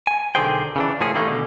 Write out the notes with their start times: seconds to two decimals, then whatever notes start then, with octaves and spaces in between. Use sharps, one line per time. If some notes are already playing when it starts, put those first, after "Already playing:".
0.07 G#5
0.35 B1 D3 D#3 G#4 C5 G5
0.76 C#3 E3 D4
1.00 A2 F3 A#3 C#4 G#4
1.15 D#3 E3 G3 A3 A#3 D#4
1.28 B2 D3